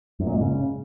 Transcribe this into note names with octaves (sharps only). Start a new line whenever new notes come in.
F#2
A#2
G#2
C#3